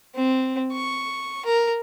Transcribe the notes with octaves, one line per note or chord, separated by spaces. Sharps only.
C4
C#6
A#4